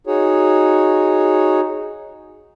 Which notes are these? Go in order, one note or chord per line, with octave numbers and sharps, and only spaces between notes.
D#4 F#4 G#4 C#5